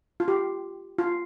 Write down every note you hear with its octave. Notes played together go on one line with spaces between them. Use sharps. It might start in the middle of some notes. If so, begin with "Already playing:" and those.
F4
G4
F4